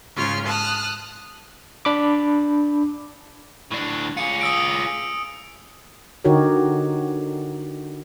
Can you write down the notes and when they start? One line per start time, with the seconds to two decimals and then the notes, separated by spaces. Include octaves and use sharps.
0.16 G#2 C#3 F4 C#5 F6
0.47 A5 D#6 F6 F#6
1.85 D4 B5 D6
3.71 A2 D4
4.17 F4 G#4 C#7
4.41 D#6 E6 D7
6.25 D3 D#4 F#4 G4 A#4 C#5